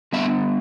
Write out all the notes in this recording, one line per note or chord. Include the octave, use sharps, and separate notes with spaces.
D3 G3 B3 E5